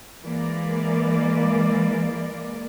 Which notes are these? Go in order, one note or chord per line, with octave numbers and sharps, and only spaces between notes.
E3 G#3 A#3 D5